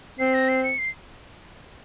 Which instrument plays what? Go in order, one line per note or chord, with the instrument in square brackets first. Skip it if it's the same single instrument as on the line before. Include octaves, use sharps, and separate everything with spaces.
[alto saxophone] C4 [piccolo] C7
[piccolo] A#6
C7
C#7
C7